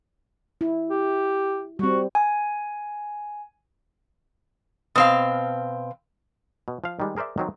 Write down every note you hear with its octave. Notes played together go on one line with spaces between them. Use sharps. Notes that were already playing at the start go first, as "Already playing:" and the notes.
E4
G4
G3 C4 F#4
G#5
B2 C4 F5
B2
F3 F5
D#3 G3 G#3
G#4 A#4 C5 D5 E5
D#3 F#3 C4